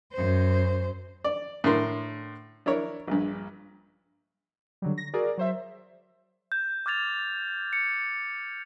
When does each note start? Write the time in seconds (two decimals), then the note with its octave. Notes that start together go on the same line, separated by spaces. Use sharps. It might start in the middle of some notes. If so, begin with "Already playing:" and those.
0.13 F#2 C5
1.24 D5
1.64 A2 D3 A#4 C6
2.66 D4 E4 A#4 C#5
3.07 A#1 G2
4.82 D3 F#3 G3
4.98 A#6
5.14 F#4 G#4 A#4 D5
5.38 F#3 C5 E5
6.52 G6
6.86 D6 F6 G#6 A6 F7
7.73 C#7